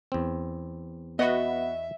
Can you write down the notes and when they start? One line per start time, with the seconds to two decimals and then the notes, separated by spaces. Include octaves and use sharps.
0.12 E2 C4
1.19 B3 F#4 B4 D#5 E5